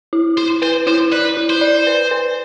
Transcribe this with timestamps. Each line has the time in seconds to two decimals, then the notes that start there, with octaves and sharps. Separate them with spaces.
0.13 E4
0.38 E4 C5
0.62 B4 C5
0.87 E4 C5
1.12 B4 D5
1.37 E4
1.50 C5
1.61 D5
1.87 B4
2.11 B4